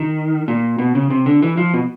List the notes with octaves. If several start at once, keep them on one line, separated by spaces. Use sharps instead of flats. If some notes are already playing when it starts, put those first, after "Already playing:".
Already playing: D#3
A#2
B2
C#3
C3
D3
E3
F3
B2